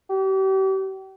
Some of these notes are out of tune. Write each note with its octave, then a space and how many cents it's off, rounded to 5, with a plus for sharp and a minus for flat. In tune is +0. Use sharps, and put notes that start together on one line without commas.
G4 -40